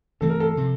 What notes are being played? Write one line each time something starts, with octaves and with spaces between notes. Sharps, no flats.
G2 E3 A3 C4 A4
A#4
A4
C3 F3 C4